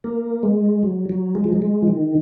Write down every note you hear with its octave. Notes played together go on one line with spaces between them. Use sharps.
A#3
G#3
F#3
F#3
G#3
F3
F#3
G#3
F3
D#3